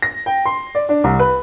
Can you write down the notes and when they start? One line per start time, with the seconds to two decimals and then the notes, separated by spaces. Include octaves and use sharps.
0.02 A#6
0.26 G5
0.45 C6
0.75 D5
0.89 D4
1.04 C2
1.19 B4